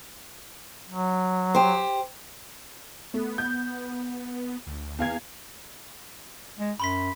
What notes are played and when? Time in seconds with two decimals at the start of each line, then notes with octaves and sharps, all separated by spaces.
0.89 F#3
1.55 G4 C5
3.14 A3 B3
3.38 G6
4.67 D2
4.99 E2 F5 G#6
6.59 G#3
6.80 F#2 B5 C6 B6